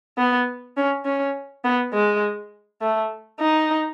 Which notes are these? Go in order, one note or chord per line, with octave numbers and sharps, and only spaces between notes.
B3
C#4
C#4
B3
G#3
A3
D#4